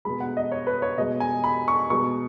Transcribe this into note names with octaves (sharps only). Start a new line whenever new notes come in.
B2 G#3 B5
F#5
D#5
C#5
B4
C#5
B2 G#3 D#5
G#5
B5
C#6
B2 G#3 C#6